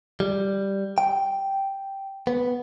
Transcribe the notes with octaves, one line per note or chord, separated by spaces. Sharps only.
G3
G5
B3